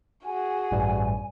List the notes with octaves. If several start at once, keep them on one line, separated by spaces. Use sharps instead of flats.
F#4 G#4 G#5
A1 G2 G3